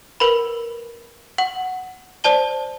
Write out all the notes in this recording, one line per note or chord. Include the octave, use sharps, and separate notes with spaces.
A#4 B4 B5
F#5 F#7
C5 D5 A5 G7